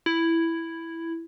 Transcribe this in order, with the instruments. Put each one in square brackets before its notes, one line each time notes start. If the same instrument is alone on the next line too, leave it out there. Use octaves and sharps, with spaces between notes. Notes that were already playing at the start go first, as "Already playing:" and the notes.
[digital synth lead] E4